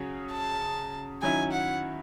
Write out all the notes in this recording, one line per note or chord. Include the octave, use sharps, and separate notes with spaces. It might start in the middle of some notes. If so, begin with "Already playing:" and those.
Already playing: C#3 F#3 C#4
A5
D#3 F#3 C#4 E4 G#5
F#5